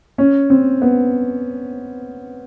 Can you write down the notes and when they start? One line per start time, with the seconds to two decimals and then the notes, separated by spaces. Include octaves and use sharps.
0.18 C#4
0.50 C4
0.82 B3